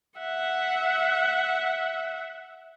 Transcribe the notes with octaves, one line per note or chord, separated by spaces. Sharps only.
E5 F#5